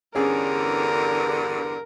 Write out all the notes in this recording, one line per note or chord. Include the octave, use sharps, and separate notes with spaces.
E2 G2 D3 C#4 G#4 A#4